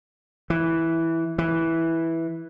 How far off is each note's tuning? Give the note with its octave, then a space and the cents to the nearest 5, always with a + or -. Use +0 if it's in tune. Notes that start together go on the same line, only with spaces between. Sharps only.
E3 -5
E3 -5